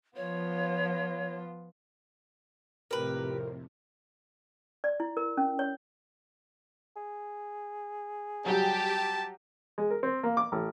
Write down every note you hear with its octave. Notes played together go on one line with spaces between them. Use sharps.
F3 B3 F4 C#5
F2 A2 C3 G4 A#4 B4
D5
E4
A#4
C#4
C#5
G#4
F#3 G3 G4 A5
G#3
A#4
C4
A#3
D6
A1